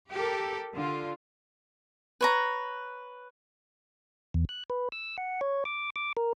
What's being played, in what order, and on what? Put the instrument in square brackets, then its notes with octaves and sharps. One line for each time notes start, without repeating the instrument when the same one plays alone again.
[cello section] G4 A4 A#4
D3 F4
[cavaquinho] B4 C#5 A#5
[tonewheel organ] E2
F#6
B4
E6
F#5
C#5
D6
D6
A#4